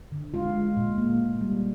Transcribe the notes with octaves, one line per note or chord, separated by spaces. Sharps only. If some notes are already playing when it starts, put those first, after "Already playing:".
D3
G#3 F4
G#3
A#2
A#3
A#2
G3